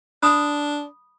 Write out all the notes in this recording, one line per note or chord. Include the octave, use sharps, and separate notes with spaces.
D4 B5 D#6